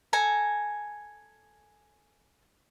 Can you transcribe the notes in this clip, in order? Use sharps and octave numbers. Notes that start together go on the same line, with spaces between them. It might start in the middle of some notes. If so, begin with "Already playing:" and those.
A4 G#5 A#5